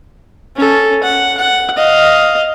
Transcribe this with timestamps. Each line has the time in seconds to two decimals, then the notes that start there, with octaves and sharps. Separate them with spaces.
0.56 C#4 A4
1.03 F#5
1.37 F#5
1.77 D#5 F5